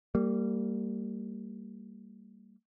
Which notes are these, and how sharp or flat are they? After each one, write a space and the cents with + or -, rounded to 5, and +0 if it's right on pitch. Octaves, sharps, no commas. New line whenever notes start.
G3 +0 A#3 -30